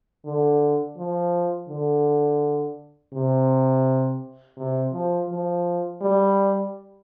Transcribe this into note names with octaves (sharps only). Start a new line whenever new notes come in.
D3
F3
D3
C3
C3
F3
F3
G3